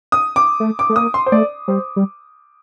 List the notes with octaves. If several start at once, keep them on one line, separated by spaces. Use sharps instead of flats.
D#6
D6
A3
D6
A3
A#3 D#6
C6
C5
A3 D5
G3 C5
G3